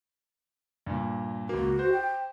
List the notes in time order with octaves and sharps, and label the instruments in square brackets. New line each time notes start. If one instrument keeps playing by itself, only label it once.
[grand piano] G2 A#2
[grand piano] C#2 A#3 [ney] F#4
[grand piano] C5
[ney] G5